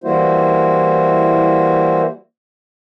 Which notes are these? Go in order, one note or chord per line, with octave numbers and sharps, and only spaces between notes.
E3 G3 A#3 E4 F#4 C5